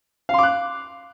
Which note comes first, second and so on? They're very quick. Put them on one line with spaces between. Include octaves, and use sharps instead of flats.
F5 C6 D6 F#6